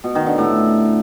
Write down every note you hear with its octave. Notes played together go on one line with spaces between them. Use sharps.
B2
D#3
D3
A2